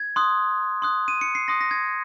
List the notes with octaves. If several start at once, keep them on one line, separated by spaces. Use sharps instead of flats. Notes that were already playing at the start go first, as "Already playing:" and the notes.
Already playing: G#6
C6 D#6 F#6
C6 D#6 F#6
D#7
C#7
C7
C6 D#6 F#6 A#6
A#6
G#6